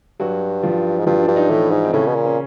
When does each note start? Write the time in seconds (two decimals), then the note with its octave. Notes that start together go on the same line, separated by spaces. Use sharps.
0.20 G2 F#3 F#4
0.63 F3 F4
0.99 G#2
1.06 G2 F3 F4
1.22 D4
1.28 G2
1.36 D#4
1.50 A2 E3 E4
1.71 G#2
1.84 C4
1.93 A2 C#3 C#4
2.07 B2
2.15 A#2
2.25 C#4